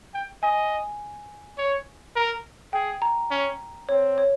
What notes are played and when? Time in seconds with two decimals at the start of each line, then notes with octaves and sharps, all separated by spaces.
0.14 G5
0.43 D#5 G#5
1.58 C#5
2.16 A#4
2.73 G#4 G5
3.02 A#5
3.31 C#4
3.89 C4 C#5
4.18 C#5